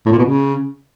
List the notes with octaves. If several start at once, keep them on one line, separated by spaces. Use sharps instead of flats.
A2
A#2
B2
C#3